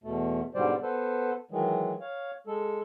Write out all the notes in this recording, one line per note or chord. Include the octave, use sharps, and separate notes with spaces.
E2 B2 A3
G#2 B2 D3 G3 C5 D5
B3 A4 B4 C5
D#3 E3 F#3 G#3
C#5 F5
G#3 A4